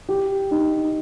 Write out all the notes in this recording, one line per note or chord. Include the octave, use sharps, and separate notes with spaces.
G4
D#4